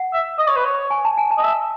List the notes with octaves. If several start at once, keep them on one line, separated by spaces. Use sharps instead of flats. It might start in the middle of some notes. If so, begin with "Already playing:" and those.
Already playing: F#5
E5
D#5
C#5
B4
C#5
G#5
A5
G#5
A5
D#5
E5